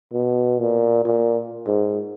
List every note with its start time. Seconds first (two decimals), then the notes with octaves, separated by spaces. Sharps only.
0.13 B2
0.60 A#2
1.05 A#2
1.67 G#2